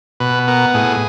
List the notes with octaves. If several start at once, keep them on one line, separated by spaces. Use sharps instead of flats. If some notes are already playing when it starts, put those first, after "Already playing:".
B2 B4
B3 A#4
A2 G#4